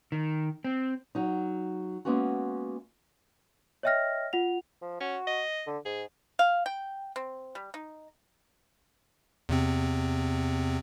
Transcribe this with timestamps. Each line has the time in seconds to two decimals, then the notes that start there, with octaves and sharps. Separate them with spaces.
0.12 D#3
0.64 C4
1.15 F#3 D#4
2.05 G#3 A#3 B3 C#4 F#4
3.83 C#5 D#5 E5 G5 F6 A#6
4.33 F4 F#5 F7
4.82 F3
5.01 C#4 F#4
5.27 D#5
5.66 D3
5.85 G#2 G#4
6.39 F5
6.66 G5
7.16 C4
7.55 G3
7.74 D#4
9.49 E2 C3 C4